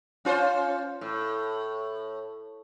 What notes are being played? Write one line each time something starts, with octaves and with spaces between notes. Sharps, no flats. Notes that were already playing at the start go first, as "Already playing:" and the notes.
C#4 F4 C5
A2